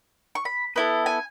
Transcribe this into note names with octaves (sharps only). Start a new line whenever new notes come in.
C#6
B5
B3 E4 A4
G#5